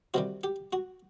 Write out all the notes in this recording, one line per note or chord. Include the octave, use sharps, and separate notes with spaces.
C3 D#3 G3 F#4
G4
F#4